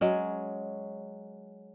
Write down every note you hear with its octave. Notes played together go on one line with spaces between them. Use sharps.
F#3 G#3 C#4